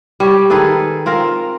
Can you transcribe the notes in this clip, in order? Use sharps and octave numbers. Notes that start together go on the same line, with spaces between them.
G3 C#5
D#3 G#4 A4 B4
C4 F4 A#4